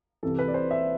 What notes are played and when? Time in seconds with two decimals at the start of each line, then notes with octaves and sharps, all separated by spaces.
0.23 C2 C3 E3 A4
0.39 B4
0.48 D5
0.54 C5
0.71 E5